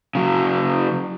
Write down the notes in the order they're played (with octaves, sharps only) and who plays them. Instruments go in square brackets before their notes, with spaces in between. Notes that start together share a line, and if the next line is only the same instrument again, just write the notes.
[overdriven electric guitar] C#3 F#3